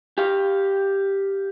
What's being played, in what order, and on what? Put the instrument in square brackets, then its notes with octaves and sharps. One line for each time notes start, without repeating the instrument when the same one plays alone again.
[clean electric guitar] G4 F5